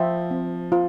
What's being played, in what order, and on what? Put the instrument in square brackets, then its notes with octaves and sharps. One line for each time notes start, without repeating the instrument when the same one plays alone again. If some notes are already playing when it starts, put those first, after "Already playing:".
Already playing: [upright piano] F3 [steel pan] F4 C5 E5 G5
[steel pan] C4
F4 C5